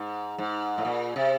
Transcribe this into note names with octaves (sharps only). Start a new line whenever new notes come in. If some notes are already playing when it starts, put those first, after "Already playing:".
Already playing: G#2
G#2
A2
A#2
C3